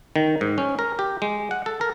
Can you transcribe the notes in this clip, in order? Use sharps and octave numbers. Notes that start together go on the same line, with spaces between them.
D#3
G#2
C#4
A#4
G4
G#3
F#5
A4
A#4